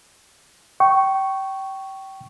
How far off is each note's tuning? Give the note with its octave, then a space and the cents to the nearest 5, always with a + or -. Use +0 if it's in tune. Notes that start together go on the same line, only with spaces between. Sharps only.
G5 -25 C#6 +0